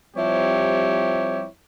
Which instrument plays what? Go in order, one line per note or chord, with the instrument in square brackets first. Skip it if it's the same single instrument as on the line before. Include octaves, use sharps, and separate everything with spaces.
[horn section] F3 G3 C4 E4 G4 C#5